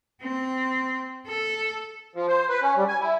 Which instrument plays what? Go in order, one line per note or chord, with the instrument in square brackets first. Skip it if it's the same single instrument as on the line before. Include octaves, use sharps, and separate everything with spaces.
[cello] C4
A4
[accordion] F3
C5
B4
C#4
G3
G#5
E4